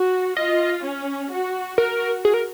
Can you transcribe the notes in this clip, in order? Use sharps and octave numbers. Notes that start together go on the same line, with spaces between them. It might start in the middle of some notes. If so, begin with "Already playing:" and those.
Already playing: F#4
F4 D#5
C#4
F#4
F#4 A#4
G#4
A#4